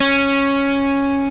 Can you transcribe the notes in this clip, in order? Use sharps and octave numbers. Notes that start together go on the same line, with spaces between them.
C#4